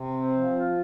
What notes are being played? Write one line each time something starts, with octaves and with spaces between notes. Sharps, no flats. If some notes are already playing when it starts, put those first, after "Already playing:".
Already playing: C3
C4
F3
F4